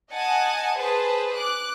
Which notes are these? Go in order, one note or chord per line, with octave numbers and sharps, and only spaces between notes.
D#5 F#5 G#5 A5
G#4 B4 C5 A5
D6 F#6